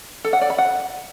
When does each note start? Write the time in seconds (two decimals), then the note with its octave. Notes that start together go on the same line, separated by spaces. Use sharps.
0.24 A4
0.33 F#5
0.41 D5
0.50 B5
0.58 F#5